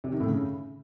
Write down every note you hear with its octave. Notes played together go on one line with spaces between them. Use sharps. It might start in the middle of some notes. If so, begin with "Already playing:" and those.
C3
D#3
A2
C#3